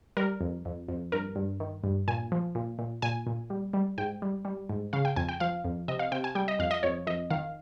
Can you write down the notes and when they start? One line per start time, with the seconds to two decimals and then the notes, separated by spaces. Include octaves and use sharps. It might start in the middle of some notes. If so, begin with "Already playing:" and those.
0.17 G3 A#4
0.41 F2
0.65 F2
0.88 F2
1.12 G2 A#4
1.36 G2
1.60 D#3
1.84 G2
2.08 A#2 G#5
2.32 F3
2.55 A#2
2.79 A#2
3.02 A#2 G#5
3.27 A#2
3.50 G3
3.73 G3
3.98 G#2 G5
4.22 G3
4.45 G3
4.69 G#2
4.93 C#3 F5
5.05 G5
5.16 F2 G#5
5.29 G5
5.40 F3 F5
5.65 F2
5.88 C3 D#5
5.99 F5
6.12 C3 G5
6.24 G#5
6.35 G3 G5
6.48 D#5
6.59 F2 F5
6.71 D#5
6.83 F2 C#5
7.07 F2 D#5
7.30 D#3 F5